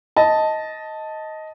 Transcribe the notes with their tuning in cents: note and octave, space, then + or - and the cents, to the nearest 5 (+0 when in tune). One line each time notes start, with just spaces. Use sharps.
D#5 +10 A5 +0